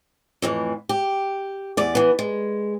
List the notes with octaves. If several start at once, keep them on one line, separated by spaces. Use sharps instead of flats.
F2 A2 E3
G4
E2 D5
E3 B3
G#3